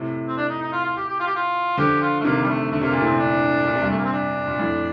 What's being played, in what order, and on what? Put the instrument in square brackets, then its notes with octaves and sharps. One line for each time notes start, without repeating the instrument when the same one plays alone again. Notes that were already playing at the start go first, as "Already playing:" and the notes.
Already playing: [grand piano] A2 C3
[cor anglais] C4
D4
D#4
D#4
F4
F4
G4
G4
F4
G4
F4
[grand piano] D3 F3 [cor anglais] G4
[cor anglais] F4
A3
[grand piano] C3 D#3 [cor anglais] A#3
[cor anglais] G3
A3
[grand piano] D3 [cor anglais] A3
[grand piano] C3 [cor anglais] A#3
[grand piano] A#2 [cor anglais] A#3
[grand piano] A2 C3
[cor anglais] C4
D4
[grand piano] A#2
C3
G2 A#2
[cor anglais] A3
A#3
C4
D4
[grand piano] A#2
F2 A2